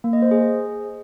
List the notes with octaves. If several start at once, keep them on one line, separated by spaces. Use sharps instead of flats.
A#3
D#5
C5
G#4